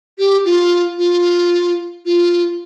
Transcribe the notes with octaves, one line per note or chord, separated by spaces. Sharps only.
G4
F4
F4
F4